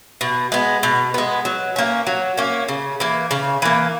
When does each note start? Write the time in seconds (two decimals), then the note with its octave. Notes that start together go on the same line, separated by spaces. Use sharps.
0.21 B2
0.52 G#3 B3
0.83 B2
1.14 G#3 B3
1.45 F#3
1.76 A#3 C#4
2.07 F#3
2.37 A#3 C#4
2.68 C#3
3.00 E3 A#3
3.31 C#3
3.62 E3 A#3